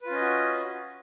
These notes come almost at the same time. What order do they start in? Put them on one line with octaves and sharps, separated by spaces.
B4 F4 C#4 D#5 F#4